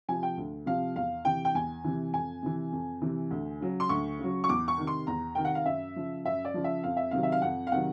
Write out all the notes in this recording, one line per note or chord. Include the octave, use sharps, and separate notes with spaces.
C3 F3 G#5
G5
D2
C3 F3 F5
E2 F5
C3 E3 G5
G5
E2 G#5
C3 E3
F2 G#5
C3 E3
F2
C3 E3
D2
C#3 F#3
C6
D2 C#6
C#3 F#3
C#6
E2 D6
C#6
C3 D#3
C6
E2 A#5
C3 D#3 G5
F#5
F5
F#2 E5
C#3 F3
F#2 E5
D5
C#3 F3
E5
F2 F5
E5
C3 D#3 F#3 F5
E5
F5
F2 F#5
F5
C3 D#3 F#3 F#5